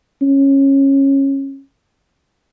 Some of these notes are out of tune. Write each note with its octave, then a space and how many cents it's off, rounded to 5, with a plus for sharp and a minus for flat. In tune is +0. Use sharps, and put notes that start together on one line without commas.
C#4 -20